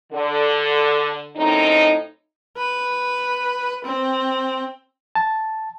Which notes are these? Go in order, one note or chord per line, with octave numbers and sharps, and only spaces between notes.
D3
F#2 A2 C4 D#4
B4
C4
A5